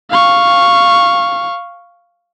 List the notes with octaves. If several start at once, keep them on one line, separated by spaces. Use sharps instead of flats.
F5 C#6